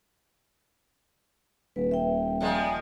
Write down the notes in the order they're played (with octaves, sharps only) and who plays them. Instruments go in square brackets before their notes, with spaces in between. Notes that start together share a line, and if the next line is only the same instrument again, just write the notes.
[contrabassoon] D#1 [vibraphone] B4
[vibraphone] E5 G5
[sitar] A#2 F3 G#3